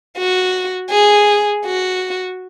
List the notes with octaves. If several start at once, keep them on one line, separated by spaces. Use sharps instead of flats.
F#4
G#4
F#4